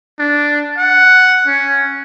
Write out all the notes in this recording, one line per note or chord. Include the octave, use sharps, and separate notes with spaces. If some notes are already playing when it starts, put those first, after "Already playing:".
D4
F#5
C#4